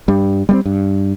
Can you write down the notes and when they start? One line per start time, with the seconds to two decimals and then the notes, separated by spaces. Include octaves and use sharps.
0.08 G2 G3
0.49 G3 A3 C4
0.66 G2